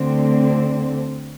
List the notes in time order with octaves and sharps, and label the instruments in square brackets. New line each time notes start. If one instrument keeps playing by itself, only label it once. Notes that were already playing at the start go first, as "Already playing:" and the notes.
Already playing: [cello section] D2 D3 C4